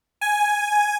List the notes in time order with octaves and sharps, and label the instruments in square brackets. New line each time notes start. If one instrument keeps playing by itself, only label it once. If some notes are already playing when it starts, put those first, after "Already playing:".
[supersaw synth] G#5